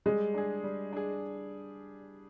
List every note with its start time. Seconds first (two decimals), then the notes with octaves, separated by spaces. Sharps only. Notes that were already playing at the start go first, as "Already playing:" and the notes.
0.06 G3 G#3
0.34 D4 G#4
0.64 G3
0.93 D4 G#4